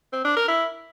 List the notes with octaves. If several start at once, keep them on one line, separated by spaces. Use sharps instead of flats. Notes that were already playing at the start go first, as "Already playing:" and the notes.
C4
D4
A#4
E4